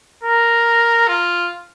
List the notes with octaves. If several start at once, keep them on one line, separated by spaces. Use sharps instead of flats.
A#4
F4